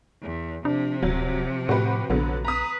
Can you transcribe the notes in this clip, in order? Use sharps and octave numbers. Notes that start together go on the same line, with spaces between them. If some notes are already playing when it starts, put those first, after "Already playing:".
E2
C3 F3 D4
D1 F#3
A2 F#4 G4 B4
A#1 D3 F#3 B3
B4 A#5 D#6